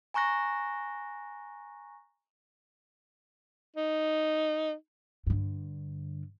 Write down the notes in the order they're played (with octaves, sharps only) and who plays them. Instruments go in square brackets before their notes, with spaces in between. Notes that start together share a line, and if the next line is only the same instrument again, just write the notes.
[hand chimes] G#5 A#5 C#6 F#6 A#6
[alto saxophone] D#4
[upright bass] G2 D3